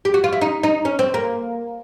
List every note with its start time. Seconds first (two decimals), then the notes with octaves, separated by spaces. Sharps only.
0.05 G4
0.14 F#4
0.24 F4
0.33 E4
0.41 D#4
0.63 D#4
0.85 C#4
0.99 C4
1.14 A#3